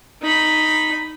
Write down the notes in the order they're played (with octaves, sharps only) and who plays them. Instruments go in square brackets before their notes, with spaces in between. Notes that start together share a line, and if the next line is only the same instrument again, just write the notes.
[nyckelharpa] D#4 B5